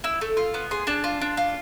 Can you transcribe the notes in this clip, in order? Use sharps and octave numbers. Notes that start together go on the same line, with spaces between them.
E4 E6
A3
F4
B3
G#4 C6
D4 A5
F4
D4
F4